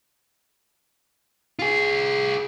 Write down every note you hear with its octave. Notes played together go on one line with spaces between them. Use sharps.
F4 G#4